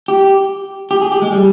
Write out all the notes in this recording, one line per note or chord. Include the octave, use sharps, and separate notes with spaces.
G4
G4
G#4
G4
G#3
G3